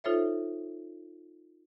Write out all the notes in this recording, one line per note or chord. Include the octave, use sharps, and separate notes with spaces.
D#4 F4 A4 C5 C#5 E5